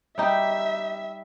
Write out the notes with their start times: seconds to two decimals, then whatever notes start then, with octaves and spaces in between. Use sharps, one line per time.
0.18 G3 D#4 G4 E5